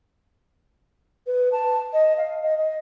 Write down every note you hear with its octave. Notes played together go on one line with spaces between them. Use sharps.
B4
A5
D#5
F5
D#5
D#5